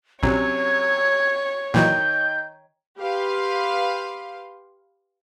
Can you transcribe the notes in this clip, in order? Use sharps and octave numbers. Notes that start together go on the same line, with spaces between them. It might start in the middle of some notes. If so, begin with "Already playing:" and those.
A#1 C3 F#3 C#4 C#5 G#6
A#2 D#3 E3 F#3 D#5 G5 G6
G4 B4 F5 C6